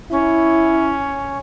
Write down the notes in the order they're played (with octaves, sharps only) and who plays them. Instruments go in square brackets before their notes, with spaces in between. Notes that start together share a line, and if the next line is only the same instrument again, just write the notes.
[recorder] C#4 [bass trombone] E4